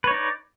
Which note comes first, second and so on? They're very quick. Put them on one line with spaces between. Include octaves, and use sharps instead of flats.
B4 C#5 D#4 D5